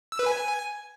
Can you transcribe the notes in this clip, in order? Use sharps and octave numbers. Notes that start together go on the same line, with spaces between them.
E6
B4
G#5